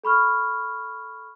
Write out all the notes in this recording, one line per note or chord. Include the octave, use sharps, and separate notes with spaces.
A4 B5 C#6 F6